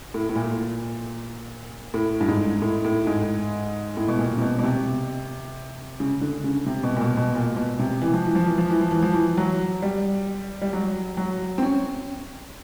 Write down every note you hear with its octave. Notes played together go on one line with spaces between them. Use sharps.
A2
A2
A#2
A2
G2
G#2
A2
A2
G#2
A2
B2
A#2
C3
B2
B2
C3
C#3
D3
C#3
C3
B2
A#2
B2
B2
A#2
B2
C3
E3
F3
E3
F3
E3
F3
E3
F3
E3
F3
E3
F#3
G3
G3
F#3
F#3
C4
C#4